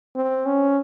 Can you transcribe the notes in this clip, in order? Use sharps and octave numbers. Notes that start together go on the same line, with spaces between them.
C4
C#4